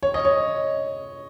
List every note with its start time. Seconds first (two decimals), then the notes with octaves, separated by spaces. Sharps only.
0.03 C#5
0.14 D#5
0.25 C#5